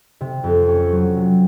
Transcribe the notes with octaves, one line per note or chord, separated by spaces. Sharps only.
C3
F2
C#4
F#3
C3